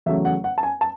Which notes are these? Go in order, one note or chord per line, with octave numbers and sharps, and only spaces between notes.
E2 C#3 F#3 A3 E5
F#5
F#5
A5
G#5
A5